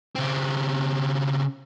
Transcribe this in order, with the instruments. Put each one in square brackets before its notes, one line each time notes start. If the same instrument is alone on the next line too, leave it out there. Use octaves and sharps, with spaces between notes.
[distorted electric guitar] C#3 C4